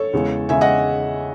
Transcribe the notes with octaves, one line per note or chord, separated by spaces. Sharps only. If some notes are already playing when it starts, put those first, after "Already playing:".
Already playing: A4 C#5
E2 C#3 G#3
E2 C#3 G#3 E5 G#5
D#5 F#5